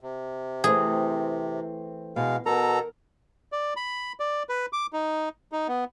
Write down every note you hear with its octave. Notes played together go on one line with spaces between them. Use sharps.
C3
E3 A3 C4 G#4
B2 G#3 F5
B2 A4 A#4 A#5
D5
B5
D5
B4
D6
D#4
D#4
B3